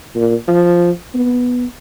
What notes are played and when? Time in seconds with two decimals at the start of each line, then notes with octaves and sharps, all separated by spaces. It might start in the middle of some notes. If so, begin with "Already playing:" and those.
0.15 A#2
0.48 F3
1.14 B3